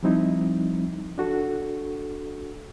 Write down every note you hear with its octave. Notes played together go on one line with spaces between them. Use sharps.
F3 G3 C4 D#4 E4
D4 F#4 A4